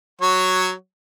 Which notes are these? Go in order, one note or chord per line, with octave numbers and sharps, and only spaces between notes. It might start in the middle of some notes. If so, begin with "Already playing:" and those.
F#3 F#4 C#5